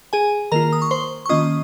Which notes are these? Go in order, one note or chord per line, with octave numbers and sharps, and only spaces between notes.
G#4 G#5
D#3 A#3 F4 A#4 A#5
D#6
C#6
C5 C6
C#6
D#3 A#3 C#4 F4 D#5 D#6